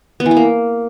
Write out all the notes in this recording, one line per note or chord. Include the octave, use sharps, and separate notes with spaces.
B3
E3
B3
A#3